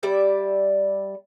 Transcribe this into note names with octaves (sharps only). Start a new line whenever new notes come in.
G3 D5 E5